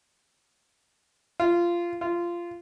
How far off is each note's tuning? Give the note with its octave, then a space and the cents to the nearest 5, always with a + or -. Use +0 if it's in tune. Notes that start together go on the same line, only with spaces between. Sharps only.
F4 -15
F4 -15